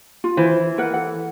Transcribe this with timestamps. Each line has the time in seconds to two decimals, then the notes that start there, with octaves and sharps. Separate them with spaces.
0.24 F4
0.37 E3 C5
0.78 A#4 B4 F#5
0.94 A4 F#5